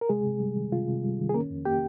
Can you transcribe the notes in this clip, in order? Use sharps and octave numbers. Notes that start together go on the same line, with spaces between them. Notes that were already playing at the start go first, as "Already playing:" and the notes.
A#4
C3 G#3 G#4
C3
G3
D#3
C3 F4
C3
G3
D#3
G#4
A#3 C#4 A#4
F2
A#3 G4 G5